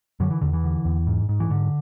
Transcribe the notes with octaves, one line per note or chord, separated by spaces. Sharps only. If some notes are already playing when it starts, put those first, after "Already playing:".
F#2 D3 F#3
E3
E2 D3
E3
D3
E2
G#2
G#2
E3
G#2 D3